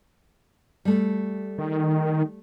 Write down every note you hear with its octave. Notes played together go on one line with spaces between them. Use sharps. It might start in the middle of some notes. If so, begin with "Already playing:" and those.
G3 A3
D#3